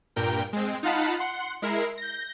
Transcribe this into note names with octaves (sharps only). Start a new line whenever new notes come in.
G2 A#2 A#4 G5 G6
G#3 C4
D#4 F4 F5 F#5 A5 B5
F#5 C6 C#7
G#3 E4 A#4 C7
G6 A#6